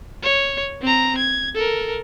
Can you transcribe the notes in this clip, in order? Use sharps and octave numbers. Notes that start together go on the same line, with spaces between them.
C#5
C4 A#5
G#6
A4 A#4